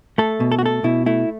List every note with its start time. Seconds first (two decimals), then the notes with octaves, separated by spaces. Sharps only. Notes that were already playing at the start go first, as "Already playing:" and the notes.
0.18 A3 A4
0.40 B2
0.52 A4
0.59 F#4
0.62 A3 A4
0.84 B2 E4
1.06 A3 E4